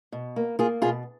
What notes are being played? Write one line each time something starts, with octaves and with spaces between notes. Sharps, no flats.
B2
A#3
A#3 F4 G#4
B2 F4 G#4